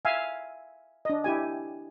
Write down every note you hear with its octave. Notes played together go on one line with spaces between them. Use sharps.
E5 F5 G#5
D4 D#5
E4 G4 G#5